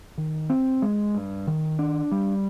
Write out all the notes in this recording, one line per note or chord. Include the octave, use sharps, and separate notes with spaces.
D#3
C4
G#3
G2
D#3
D4
G3